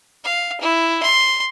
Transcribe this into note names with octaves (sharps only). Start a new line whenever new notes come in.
F5
E4
C6